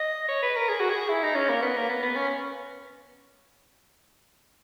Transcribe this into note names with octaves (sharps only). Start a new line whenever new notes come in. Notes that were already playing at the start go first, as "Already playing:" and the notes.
Already playing: D#5
C#5
B4
A#4
G#4
F#4
G#4
E4
D#4
C#4
A#3
B3
A#3
B3
B3
C#4